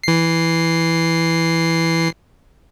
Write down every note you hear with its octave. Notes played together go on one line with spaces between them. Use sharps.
E3 C7